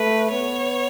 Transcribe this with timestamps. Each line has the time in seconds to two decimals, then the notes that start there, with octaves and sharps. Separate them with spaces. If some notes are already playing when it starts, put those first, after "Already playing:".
Already playing: A3 B4
0.31 B3 C#5